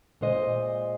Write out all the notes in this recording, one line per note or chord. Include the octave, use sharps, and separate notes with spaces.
A#2 G#3 C5 D#5